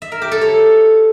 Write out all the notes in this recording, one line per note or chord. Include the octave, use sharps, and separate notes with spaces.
E5
A#4
G4
A4
C#5